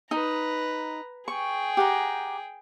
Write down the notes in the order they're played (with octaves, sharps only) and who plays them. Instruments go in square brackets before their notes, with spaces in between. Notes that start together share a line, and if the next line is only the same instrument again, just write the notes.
[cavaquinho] D#4 [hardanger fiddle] B4 A#5
[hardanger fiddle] G#4 G5 [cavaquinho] C#6
[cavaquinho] G4 F#5 A#5